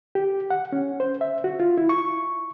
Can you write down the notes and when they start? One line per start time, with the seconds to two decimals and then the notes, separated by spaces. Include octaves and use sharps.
0.15 G4
0.50 F#5
0.72 C#4
1.00 C5
1.21 E5
1.44 F#4
1.60 F4
1.78 E4
1.89 C#6